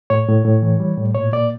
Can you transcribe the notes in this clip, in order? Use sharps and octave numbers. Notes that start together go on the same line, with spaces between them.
A2 C#5
A2
A2
E3
G3
A2
A#2 C#5
A#2 D5